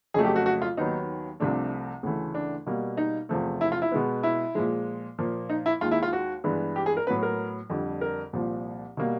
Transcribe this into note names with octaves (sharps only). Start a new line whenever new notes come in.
F2 C#3 F#3 A3 G#4
G4
F#4
F#4
F4
D#2 D#3 F#3 B3 D#4
C2 C3 F3 A3 D4
D2 C#3 E3 A3
D4
B2 G3 A#3
D#4
E2 C3 F3 A3
E4
F4
E4
B2 G#3 B3
E4
A#2 F3 G#3
A#2 F3 A#3
D#4
E4
D#2 D#3 G#3 F4
E4
F4
F#4
G2 E3 G#3 B3
G4
G#4
A#4
A2 F#3 B3 B4
A#4
F2 D3 G3
A#4
C2 A#2 F3
B2 G3 A#3